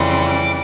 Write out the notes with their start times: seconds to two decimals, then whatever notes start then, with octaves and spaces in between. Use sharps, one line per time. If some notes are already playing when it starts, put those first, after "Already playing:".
Already playing: F2 C#3 E3 G3 C6
0.28 D6